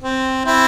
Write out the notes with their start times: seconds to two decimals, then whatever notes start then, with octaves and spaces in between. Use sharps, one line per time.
0.02 C4
0.45 C4 E4